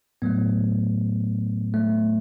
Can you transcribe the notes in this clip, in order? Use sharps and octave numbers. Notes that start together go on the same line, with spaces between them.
A2 F#3 A3 B3
A3